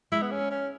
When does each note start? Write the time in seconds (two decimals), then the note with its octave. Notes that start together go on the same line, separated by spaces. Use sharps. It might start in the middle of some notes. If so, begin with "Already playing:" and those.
0.12 G#3 E4
0.22 B3
0.31 C#4
0.51 C#4